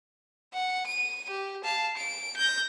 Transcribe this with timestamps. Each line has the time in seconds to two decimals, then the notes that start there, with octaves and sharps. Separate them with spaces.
0.53 F#5
0.87 D#7
1.30 G4
1.64 F5 A5
1.97 D7
2.37 G6 A#6